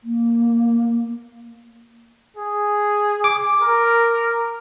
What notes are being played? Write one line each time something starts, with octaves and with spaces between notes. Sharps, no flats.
A#3
G#4
D6
A#4